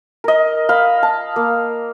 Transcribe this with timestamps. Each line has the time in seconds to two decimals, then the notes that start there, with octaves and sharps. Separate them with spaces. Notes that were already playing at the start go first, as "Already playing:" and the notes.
0.24 A#4 D#5
0.69 F5 B5
1.03 A5
1.36 A#3